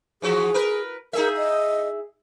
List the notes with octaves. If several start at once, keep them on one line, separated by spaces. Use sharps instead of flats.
E3 F3 F#4 G#4
A#4 B4
D#4 G#4 A#4 E5
D#5